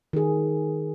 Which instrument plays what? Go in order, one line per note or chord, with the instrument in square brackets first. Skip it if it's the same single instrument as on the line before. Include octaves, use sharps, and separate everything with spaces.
[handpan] D#3 G#4